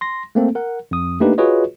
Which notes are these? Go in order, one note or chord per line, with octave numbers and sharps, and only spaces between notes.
C6 A#6
A3 A#3 C4 A4
A#4 F#5
F2 D#6
A3 A#3 D4 D#4 G4 B4
F4 F#4 G#4 B4 C#5 D#5